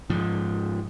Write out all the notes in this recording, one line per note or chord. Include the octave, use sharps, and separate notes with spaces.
G#2 F3